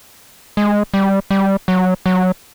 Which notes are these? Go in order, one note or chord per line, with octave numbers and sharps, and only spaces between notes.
G#3
G3
G3
F#3
F#3